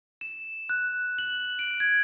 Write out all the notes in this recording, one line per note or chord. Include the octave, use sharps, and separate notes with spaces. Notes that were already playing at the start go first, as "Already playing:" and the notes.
E7
F#6
F#7
D7
G#6